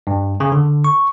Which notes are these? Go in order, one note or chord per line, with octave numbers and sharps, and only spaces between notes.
G2
C#3
D3
C#6